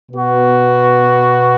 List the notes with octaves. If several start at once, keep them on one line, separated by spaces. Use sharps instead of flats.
B2 B3 F#4